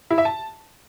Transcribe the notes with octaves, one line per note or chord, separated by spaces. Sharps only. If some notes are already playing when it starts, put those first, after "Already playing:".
E4
E5
A5